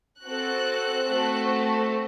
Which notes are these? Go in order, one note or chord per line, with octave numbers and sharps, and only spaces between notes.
C4 F#4 A4 F#6
A3 C4 F#4 A4